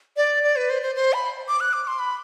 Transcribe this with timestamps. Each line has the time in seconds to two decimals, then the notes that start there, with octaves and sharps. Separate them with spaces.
0.17 D5
0.43 D5
0.56 B4
0.70 C5
0.82 C5
0.95 C5
1.13 B5
1.48 D6
1.60 F#6
1.73 D6
1.87 C6
1.99 B5